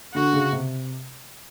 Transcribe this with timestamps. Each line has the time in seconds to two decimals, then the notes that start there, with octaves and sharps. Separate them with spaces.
0.14 D3 F#4
0.33 C#3
0.52 C3